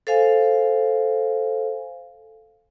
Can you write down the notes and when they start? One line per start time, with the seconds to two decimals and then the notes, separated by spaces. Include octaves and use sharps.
0.07 A4 C5 F5 G#5